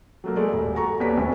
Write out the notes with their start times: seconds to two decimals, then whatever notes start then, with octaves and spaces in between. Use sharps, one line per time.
0.24 F#3 A3 A#3
0.36 G#3 A3 D5
0.53 D#1
0.74 F#4 A4 A#5 C#6
1.00 D#2 B4 C#5 D5 B6
1.16 E1 D2